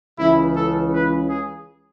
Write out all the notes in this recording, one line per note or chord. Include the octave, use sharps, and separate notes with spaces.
C#2 C#3 E3 E4
A4
B4
G#4